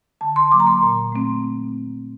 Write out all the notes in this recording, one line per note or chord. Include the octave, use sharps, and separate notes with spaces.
D3 A5
C6
F#3 A#3 D6
A#5
C6
A#2
A3 C4